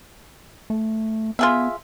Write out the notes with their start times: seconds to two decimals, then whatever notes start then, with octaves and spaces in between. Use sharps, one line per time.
0.70 A3
1.39 B3 F4 G#4 E5